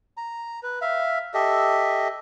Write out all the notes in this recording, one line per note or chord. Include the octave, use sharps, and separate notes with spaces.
A#5
B4
E5 F5
G4 A4 D#5 E5